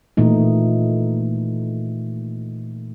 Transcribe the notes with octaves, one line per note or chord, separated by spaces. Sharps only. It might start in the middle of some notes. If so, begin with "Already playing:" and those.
A#2 E3 A3 D#4